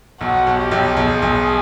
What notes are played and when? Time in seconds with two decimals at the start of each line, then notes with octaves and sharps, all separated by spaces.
0.21 B1 F#4
0.47 B1
0.59 G4
0.72 B1
0.97 B1 G#4
1.22 B1